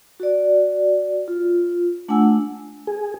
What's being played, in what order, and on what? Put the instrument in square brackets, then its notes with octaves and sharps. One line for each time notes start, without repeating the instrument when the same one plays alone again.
[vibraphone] F#4 D5
F4
A3 D4 F4 F#5 G#5 E6
[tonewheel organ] G#4